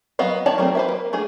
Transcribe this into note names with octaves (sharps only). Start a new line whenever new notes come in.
F#3 B3 D#5 F5
D#3 C#5 D5 A5
F#3 A3 A#3 C4
B4 C5 E5
A#3
A3 D4 G#4